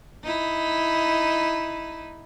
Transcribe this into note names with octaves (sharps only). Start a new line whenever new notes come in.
D#4 E4